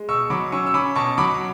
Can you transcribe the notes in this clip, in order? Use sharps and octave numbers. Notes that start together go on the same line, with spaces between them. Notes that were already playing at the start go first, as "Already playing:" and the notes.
Already playing: G#3
B2 C#6 E6
F#3 B5 D6
C#4 C#6 E6
E6
C#4 B5 D6
B2 A5 C#6
F#3 B5 D6